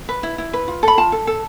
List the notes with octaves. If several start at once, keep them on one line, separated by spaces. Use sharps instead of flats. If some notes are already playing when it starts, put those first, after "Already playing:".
B4
E4
E4
B4
F4
A4 B5
F4 A5
A4
A4